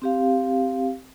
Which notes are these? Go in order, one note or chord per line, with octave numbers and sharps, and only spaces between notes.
C4 G4 F5